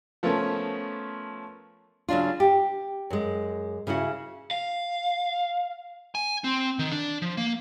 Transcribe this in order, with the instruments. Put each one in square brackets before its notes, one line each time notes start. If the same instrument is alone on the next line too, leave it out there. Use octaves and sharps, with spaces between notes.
[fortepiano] F3 A3 B3 C#4 A#4
[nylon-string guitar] C#3 F#3 D4 F4
G4
F#2 G#3
C#3 C#4 E4 F#4
[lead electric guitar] F5
G#5
C4
D#3
D4
F3
A#3